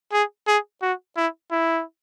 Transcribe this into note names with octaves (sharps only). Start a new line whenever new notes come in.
G#4
G#4
F#4
E4
E4